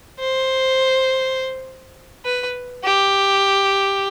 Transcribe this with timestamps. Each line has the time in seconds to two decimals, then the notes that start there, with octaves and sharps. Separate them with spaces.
0.19 C5
2.25 B4
2.84 G4